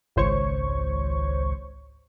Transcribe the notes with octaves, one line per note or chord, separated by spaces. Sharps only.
G#1 C#2 C5 C#5 C#6